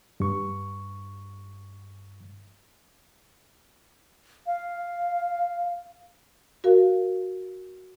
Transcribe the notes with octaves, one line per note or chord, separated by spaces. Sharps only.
G2 C#6
F5
F#4 A#4 F5